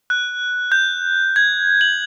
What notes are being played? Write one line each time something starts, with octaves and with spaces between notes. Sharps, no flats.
F#6
G6
G#6
F#7